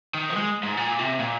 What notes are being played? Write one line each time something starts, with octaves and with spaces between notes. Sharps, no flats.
D#3
F3
G#3
G#2
A#2
C3
A#2